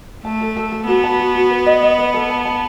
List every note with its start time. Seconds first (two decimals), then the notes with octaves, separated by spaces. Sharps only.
0.25 A3 A5
0.41 A4
0.56 A4
0.72 A4
0.88 B3 F#4
1.04 A5
1.20 F#4
1.35 F#4
1.51 B4
1.66 D#5
1.83 D#5
1.98 B4
2.14 A4
2.30 A5
2.45 A5